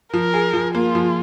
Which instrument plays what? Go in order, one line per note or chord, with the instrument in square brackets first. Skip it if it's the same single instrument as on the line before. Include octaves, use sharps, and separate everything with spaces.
[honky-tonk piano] F3 [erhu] A#4
[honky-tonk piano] G#4
F3
[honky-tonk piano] A#3 [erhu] F4
[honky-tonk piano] F3